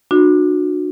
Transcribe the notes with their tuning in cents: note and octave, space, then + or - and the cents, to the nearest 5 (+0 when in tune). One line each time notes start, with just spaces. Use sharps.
D4 +30 F#4 -25